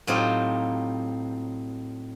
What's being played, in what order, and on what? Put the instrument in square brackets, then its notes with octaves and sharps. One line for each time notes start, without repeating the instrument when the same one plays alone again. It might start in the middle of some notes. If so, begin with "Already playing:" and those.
[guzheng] A2 F#3 C4 D#4 F4 G4